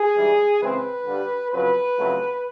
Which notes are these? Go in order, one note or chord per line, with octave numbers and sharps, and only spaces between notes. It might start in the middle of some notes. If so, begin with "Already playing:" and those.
Already playing: G#4
G#2 E3 G3
C#3 E3 G#3 C4 B4
G2 D3 G3
F2 C#3 F#3 B4
F2 C#3 F#3 A3